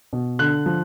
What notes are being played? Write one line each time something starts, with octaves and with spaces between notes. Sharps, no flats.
B2
D3 F#6
F3